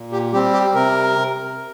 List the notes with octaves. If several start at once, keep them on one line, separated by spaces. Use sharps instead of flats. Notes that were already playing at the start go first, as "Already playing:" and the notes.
Already playing: A#2
G4
G3 C4 G4
G4
C3 A#4